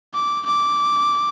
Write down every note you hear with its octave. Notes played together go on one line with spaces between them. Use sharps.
D6
D6